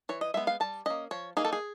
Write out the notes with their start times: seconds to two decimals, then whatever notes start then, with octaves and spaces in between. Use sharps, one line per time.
0.09 E3 C#5
0.21 D#5
0.34 G#3 B3 E5
0.47 F5
0.60 G3 A5
0.86 A#3 C#4 D#5
1.11 F3 C#5
1.37 A#3 D#4 G#4
1.45 A4
1.53 G#4